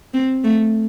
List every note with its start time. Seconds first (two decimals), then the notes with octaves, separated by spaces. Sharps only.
0.14 C4
0.44 A3